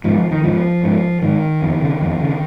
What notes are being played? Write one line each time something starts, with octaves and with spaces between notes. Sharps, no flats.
G#2 F3
F3
D#3
G#2 F3
G#2
G#2 D#3
F2
C#3
F2
C#3